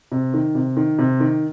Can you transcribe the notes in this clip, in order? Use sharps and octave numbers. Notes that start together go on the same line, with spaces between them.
C3
D#3
C3
D#3
C3
D#3